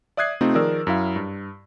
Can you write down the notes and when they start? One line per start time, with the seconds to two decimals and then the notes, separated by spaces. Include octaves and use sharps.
0.17 D5 E5 D#6 F#6 G#6 C7
0.41 C3 A3 C4 D#4 F4
0.54 D#3 F3 G#4 A#4 D5 E6
0.87 F#2 E4 F5
1.16 G2